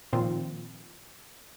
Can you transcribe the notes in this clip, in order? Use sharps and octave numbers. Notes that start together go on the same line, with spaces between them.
A#2 D#3 F3 C4 F4